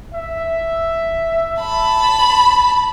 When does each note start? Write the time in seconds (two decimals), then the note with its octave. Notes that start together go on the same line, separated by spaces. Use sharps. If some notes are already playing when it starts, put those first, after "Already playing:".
0.14 E5
1.62 A5 B5